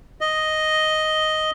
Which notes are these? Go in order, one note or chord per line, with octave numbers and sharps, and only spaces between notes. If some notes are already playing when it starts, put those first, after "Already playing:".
D#5